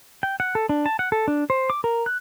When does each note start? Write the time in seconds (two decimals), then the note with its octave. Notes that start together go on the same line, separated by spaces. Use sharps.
0.23 G5
0.40 F#5
0.55 A4
0.69 D4
0.86 A5
0.99 F#5
1.12 A4
1.28 D4
1.50 C5
1.70 D6
1.84 A#4
2.06 F#6